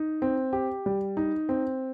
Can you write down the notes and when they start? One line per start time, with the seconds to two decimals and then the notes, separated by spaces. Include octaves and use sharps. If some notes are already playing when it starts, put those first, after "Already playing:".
Already playing: D#4
0.22 C4
0.53 G4
0.86 G3
1.17 D#4
1.49 C4